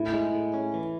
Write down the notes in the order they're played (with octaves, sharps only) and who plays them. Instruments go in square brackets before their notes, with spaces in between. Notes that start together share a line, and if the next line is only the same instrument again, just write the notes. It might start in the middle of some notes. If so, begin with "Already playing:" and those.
Already playing: [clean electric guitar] A2 [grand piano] E4
[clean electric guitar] G#3
A2
C#4
E3